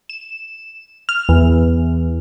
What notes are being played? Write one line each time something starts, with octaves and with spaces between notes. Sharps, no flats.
E7
F6
E2